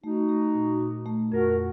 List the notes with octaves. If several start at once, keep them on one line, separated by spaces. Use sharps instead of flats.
A3 D#4 F#4
A3
A#2
A#2
A3
F2 F#4 A#4